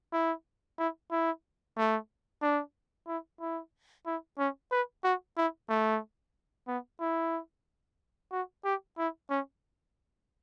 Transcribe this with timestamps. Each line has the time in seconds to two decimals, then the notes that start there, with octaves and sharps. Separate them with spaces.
0.12 E4
0.78 E4
1.11 E4
1.77 A3
2.41 D4
3.07 E4
3.40 E4
4.06 E4
4.39 C#4
4.71 B4
5.04 F#4
5.37 E4
5.69 A3
6.68 B3
7.00 E4
8.32 F#4
8.65 G4
8.98 E4
9.30 C#4